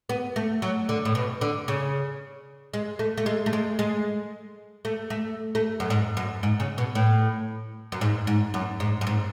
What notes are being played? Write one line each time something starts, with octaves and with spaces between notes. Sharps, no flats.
B3
A3
F#3
D3
A2
B2
D3
C#3
G#3
A3
A3
G#3
A3
G#3
G#3
A3
A3
A3
F#2
G#2
F#2
G#2
C#3
B2
A2
F#2
G#2
G#2
F#2
G#2
F#2
G#2